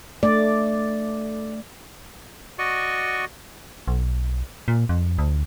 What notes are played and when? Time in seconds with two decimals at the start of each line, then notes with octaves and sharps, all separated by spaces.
0.23 A3 D5
2.58 F#4 D5 D#5 C#6
3.88 B1
4.68 A#2
4.89 F2
5.18 D2